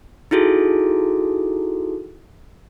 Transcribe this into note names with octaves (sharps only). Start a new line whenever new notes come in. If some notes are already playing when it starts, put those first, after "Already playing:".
D#4 E4 F#4 G#4 A4